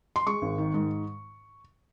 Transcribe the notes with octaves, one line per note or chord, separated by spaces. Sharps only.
C6
G#3 C#6
G#1
D#3
G#2